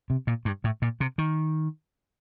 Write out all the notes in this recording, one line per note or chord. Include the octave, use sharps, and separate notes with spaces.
C3
A#2
G2
A2
A#2
C3
D#3